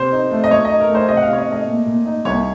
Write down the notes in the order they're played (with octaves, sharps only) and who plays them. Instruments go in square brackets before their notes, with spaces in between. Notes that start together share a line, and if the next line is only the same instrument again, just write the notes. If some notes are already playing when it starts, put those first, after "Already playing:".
Already playing: [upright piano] C3 C5
D#4
A3
D#5
F#2 C#5
D#5
D#4
A#4
A3
C5
C3 D#5
F#5
F5
C3 C#5
D#5
A3 D#5
A#2
A#2
D#4
C2 C#5